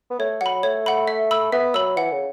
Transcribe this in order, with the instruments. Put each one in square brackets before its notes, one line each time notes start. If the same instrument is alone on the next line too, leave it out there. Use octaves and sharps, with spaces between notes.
[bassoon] B3
[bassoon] A3 [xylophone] C#5
[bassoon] F#3 [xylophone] F#5 B5
[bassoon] A3 [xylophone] C#5
[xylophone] F#5 B5
E5
B5 E6
[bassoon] B3 [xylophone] E5
[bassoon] F#3 [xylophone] B5 E6
[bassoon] E3 [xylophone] F#5
[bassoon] C#3